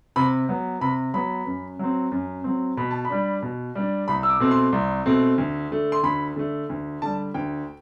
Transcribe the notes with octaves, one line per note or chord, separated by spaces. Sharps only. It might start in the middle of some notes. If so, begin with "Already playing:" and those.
C3 B5
F#3 B3
C3 B5
F#3 B3 B5
F#2
F#3 C4
F#2
F#3 C4
B2 B5
A5
B5
G3 D4
B2
G3 D4
C2 B5
E6
D6
B2 A3 C4
C6
C2
B2 A3 C4
D2
D3 A3
C6
D2 B5
D3 A3
D2
D3 G3 A5
D2 G5